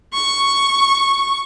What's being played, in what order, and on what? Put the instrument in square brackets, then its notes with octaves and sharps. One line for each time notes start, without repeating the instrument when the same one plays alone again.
[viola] C#6